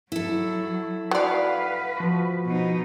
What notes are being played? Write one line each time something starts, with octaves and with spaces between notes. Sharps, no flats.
F#3 E4 A4
F#3 B4 D5 F5 F#5
F3 F#4
B2 D#4